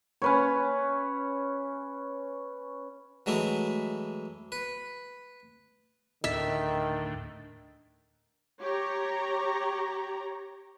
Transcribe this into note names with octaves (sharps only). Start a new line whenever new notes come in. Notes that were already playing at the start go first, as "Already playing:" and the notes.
C#4 B4 C#5
E3 F#3 G#3 A3 E4
B4
D2 A2 D#3 E5
G4 C#5 A#5